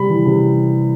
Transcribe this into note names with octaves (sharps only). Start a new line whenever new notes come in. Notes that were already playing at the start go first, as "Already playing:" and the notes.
Already playing: C3 G3 B5
E3
C3